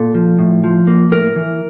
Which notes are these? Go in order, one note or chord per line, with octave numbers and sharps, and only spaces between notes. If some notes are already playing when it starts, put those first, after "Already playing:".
Already playing: A#2 A4
F3
A2
F3
A#3
A2 A#4
E3